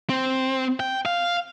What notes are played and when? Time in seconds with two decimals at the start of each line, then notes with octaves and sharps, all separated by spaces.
0.10 C4
0.80 G5
1.06 F5